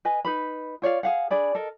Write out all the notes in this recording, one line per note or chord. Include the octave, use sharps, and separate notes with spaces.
B4 D#5 G#5
D#4 B4 B5
F4 C#5 D5 F5
G#4 F5 F#5
D4 G#4 D5 B5
A4 A#4 D#5